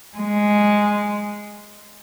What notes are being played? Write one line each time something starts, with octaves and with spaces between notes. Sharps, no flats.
G#3